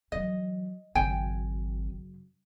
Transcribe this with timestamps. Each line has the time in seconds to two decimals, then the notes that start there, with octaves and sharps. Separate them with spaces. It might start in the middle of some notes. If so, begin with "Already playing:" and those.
0.12 E3 F#3 D#5
0.95 G#1 F#2 C#3 G5 G#5